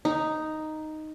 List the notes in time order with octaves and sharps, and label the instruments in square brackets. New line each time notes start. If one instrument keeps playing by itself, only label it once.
[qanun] D#4